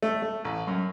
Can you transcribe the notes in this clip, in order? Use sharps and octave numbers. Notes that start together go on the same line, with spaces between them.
A3
A3
A1
F#2